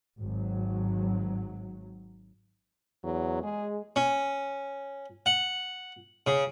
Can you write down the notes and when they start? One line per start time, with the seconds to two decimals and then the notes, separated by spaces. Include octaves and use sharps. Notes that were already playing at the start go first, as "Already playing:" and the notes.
0.21 G#1 F#3
3.04 E2 F#3
3.43 G#3 G#4
3.96 C#4
5.26 F#5
6.27 C#3